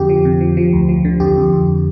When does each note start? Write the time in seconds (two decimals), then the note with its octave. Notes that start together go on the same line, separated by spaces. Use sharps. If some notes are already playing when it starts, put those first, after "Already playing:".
Already playing: F2 D3 G4
0.09 F3
0.25 C3
0.41 F3
0.57 F3
0.73 D2
0.89 F3
1.05 D3
1.20 F2 G4
1.37 F2
1.53 F2